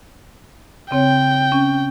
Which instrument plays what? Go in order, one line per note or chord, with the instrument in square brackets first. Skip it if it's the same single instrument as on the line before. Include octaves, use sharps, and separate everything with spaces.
[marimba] C#3 C4 C#5 [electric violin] G5
[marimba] C#4